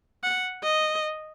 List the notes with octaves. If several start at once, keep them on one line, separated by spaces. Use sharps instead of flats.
F#5
D#5